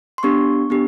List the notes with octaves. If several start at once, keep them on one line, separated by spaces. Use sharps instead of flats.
C6
B3 D4 G4 C#6
B3 D4 G4